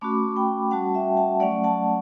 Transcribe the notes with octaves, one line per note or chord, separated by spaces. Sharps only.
A3 C#4 F#4 B5 D6
G5 B5
G3 C#4 F#4 F#5 A5
E5 G5
F#5 A5
F#3 A3 C#4 D5 F#5
F#5 A5